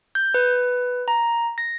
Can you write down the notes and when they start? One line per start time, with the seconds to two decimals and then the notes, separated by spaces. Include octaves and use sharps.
0.15 G6
0.34 B4
1.08 A#5
1.58 A#6